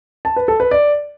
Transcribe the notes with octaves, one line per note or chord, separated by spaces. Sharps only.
A5
B4
A4
B4
D5